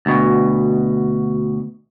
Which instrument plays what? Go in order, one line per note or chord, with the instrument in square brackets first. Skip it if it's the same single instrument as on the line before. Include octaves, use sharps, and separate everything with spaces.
[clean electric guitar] D2 B2